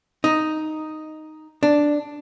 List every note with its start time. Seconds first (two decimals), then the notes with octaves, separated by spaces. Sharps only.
0.24 D#4
1.63 D4